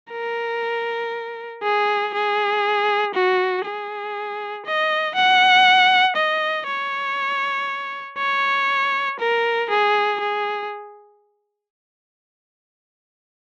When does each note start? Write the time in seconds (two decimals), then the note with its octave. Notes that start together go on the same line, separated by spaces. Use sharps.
0.12 A#4
1.63 G#4
2.14 G#4
3.14 F#4
3.65 G#4
4.66 D#5
5.15 F#5
6.16 D#5
6.67 C#5
8.18 C#5
9.20 A#4
9.70 G#4
10.20 G#4